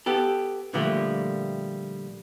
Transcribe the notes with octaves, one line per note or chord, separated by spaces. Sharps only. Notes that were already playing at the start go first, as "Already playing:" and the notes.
B3 G4 A4
A#2 D3 F3 G3 A3 A#3